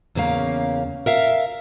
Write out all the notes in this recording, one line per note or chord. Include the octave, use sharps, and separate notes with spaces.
E2 C#3 A#3 C#4 F5
A#4 E5 F5